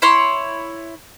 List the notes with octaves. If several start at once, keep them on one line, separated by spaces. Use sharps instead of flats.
E4 C#5 C6